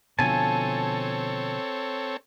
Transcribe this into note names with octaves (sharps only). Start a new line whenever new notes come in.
B2 D3 F3 C4 A4 C#5 G#5 A5